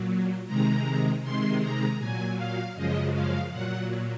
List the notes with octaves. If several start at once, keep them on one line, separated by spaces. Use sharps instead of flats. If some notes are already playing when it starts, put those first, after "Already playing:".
Already playing: A#2 F#3
C3 D#3 G#3 A#5
C3 D#3 G#3 C6
A#5
A#2 F#3 G#5
F5
F#2 C#3 F3 G#3 D#5
F5
A#2 F#3 F#5